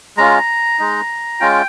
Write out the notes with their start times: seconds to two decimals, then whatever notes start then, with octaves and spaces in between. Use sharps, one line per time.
0.17 G#3 C#4 F4 A#5
0.79 G#3 D#4
1.40 G#3 C#4 F4 G5